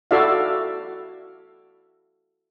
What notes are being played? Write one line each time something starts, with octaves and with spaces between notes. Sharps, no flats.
E4 F#4 A4 D5 E5 F5